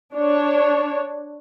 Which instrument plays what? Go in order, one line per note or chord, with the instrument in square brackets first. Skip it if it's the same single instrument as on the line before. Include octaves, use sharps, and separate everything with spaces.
[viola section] D4 C#5